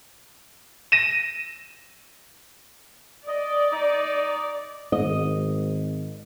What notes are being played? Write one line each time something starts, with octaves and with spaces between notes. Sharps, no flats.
A#6 D#7 E7
D5 D#5
D#4
G#1 D#5